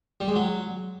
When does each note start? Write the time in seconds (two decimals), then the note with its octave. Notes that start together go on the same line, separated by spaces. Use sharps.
0.20 G3
0.28 G#3
0.36 F#3